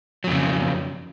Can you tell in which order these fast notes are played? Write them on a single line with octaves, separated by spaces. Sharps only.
F#3 F2 C#3